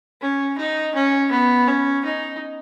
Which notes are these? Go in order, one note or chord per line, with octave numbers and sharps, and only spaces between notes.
C#4
D#4
C#4
B3
C#4
D#4